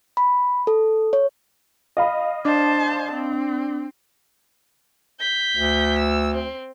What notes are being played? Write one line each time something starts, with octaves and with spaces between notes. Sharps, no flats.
B5
A4
C#5
D#5 F5 B5
D4 C5 A5
C4
G6 B6
D2
E6
C4